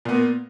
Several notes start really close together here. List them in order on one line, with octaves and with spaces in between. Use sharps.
A#2 B3 A#3